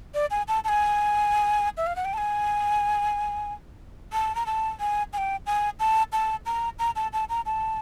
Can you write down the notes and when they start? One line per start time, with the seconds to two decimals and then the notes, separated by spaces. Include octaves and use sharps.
0.14 D5
0.31 G#5
0.48 A5
0.64 A5
0.69 G#5
1.77 E5
1.87 F5
1.96 F#5
2.05 G5
2.14 A5
2.18 G#5
4.13 A5
4.35 A#5
4.46 A5
4.80 G#5
5.13 G#5
5.18 G5
5.47 G#5
5.80 A5
6.13 A5
6.46 A#5
6.79 A#5
6.96 A5
7.13 A5
7.29 A#5
7.46 A5